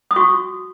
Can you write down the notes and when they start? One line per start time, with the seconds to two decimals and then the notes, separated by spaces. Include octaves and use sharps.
0.11 D#6
0.16 F#4 C#6